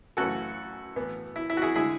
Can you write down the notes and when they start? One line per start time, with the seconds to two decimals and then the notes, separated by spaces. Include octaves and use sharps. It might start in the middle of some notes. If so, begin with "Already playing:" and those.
0.17 F#2 C#3 E3 A3 C#4 F#4 A4
0.96 A2 E3 B3
1.36 E4
1.50 E4
1.57 F#4
1.62 E4 G#4
1.76 D3 G#3 E4 G#4